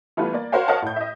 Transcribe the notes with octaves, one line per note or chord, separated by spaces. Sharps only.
E3 G3 A3 B3 F4 B4
A#3 D5
F#4 A#4 C5 C#5 F5 G5
A#4 C#5 D#5 F5 F#5 A5
A2 G6
D#5 E5